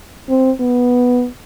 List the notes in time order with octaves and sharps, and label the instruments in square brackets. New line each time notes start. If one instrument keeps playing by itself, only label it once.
[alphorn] C4
B3